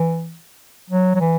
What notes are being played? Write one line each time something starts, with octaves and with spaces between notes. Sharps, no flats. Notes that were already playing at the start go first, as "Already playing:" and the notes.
Already playing: E3
F#3
F#3
E3